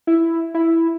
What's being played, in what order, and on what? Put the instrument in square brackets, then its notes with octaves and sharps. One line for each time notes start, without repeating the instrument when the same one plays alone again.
[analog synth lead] E4
E4